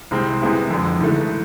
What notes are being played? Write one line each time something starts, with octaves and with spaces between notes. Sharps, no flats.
C2 C3 G#3 C4
C3 G#3 B3 E4 G#4
F2 D3 G#3
G#2 E3 A3